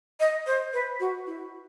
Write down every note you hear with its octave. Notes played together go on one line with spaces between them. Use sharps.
D#5
C5
B4
F#4
E4